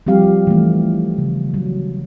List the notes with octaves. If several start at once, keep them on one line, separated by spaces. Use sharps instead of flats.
F3 G3 C4 G4 F5
E3 A3
C#3
F#3